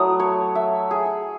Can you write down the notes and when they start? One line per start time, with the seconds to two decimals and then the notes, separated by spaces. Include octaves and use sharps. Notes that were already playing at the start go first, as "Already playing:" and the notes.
Already playing: F#3 A3 E4 A4 D#6
0.20 C#5
0.55 E5
0.91 G#4